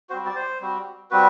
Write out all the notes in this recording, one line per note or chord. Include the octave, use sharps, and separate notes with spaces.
G3 C4 F#4 C5
D5
C5
G3 C4 F#4
G3 C4 F#4 B4